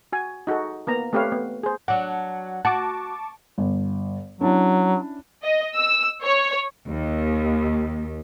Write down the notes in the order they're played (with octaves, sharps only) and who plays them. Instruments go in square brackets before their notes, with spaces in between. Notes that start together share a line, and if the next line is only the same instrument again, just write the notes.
[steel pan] F#4 G#5
D#4 F#4 G#4 A4
A#3 B3 A#5
A3 C4 G4 B4 C#5 F5
B3
G#4 C5
[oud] F#3 D4 [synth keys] F#5
[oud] F#4 [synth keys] A5 C#6 D6
[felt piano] G1
[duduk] F#3 [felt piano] C#4 D4 E4
[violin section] D#5
E6
C#5
[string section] D#2